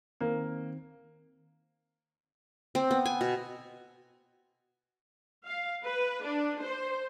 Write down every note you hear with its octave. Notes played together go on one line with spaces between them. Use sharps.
D#3 A#3 C4
C4
B3
G#5
B2
F5
B4
D4
C5